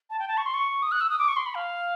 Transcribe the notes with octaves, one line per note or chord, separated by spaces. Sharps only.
A5
G5
A5
C#6
C6
C#6
D#6
F#6
E6
D#6
D6
C#6
C6
B5
F5